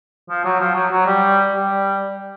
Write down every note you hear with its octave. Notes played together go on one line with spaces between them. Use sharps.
F3
F#3
F3
F#3
F#3
G3
G3